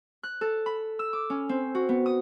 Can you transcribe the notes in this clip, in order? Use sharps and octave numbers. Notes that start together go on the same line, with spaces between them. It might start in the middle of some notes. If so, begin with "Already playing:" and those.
F#6
A4
B5
E6
D6
C#4
C4
F#4
B3
D#6